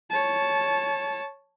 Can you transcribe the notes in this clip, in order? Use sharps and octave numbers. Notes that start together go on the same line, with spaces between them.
C#5 A5